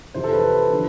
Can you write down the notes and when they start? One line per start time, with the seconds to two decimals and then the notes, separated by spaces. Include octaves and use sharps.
0.14 F2 C3 E3 C5
0.24 A4
0.33 B4
0.70 D3 F3